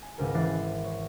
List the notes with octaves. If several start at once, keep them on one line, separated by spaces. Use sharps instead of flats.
G#5
G#1 C#2 A#4 G#5
G#1 E3 D6 F#6 A6 C7
C#5